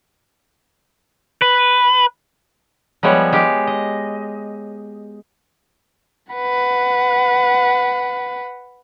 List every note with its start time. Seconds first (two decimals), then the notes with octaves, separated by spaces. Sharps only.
1.42 B4
3.03 F3 G3 G#3 B3 C#5
3.32 G#3 G4 F5
3.67 D#5
6.33 B4 F#5